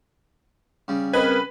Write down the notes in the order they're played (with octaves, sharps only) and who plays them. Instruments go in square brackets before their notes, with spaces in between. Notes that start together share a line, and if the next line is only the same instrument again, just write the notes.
[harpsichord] C#3 G3
[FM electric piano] C4 D#5 G#6 [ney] A#4 [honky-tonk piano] B4